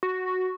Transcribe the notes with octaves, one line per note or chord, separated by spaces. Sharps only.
F#4